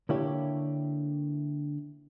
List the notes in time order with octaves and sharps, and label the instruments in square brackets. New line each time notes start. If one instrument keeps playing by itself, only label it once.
[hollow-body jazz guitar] D3 A#3 E4 G4 C#5